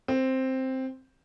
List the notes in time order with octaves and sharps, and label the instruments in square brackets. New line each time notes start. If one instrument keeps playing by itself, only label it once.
[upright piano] C4